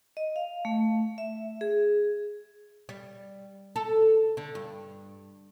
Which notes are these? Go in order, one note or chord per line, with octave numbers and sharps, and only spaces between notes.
D#5
F5
A3
E5
G#4
G3
A4
D3
G2